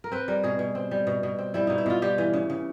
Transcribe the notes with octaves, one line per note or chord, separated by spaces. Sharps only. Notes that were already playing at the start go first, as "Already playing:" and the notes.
A#4
C4 B4
G3 A#4
B2 G#4
B2
C4
G3
B2
B2
C4
G3 E4
B2 D#4
E4
B2 F4
G3 G4
E3
C#3
C#3